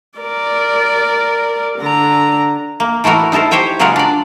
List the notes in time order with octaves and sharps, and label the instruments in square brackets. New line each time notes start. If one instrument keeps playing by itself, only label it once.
[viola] A#4 D5
D3 A#5
[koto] A#3
E3 A3 E4 F#4 A#4
D#4 E4 A4 A#4 C5
G4 C5 C#5 G5 G#5
C#3 F#3 G#3 F4 A#4 F#5
D4 D5